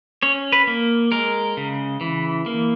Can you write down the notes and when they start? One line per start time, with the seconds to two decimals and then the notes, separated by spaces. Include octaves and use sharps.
0.22 C#4 C#5
0.52 B4
0.67 A#3
1.12 G#3 A#4
1.57 C#3
2.01 E3
2.46 A#3